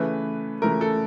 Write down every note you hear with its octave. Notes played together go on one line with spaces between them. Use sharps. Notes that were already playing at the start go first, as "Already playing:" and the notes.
Already playing: C#3 E3 A3 B4
C#3 E3 A3 A#4
A4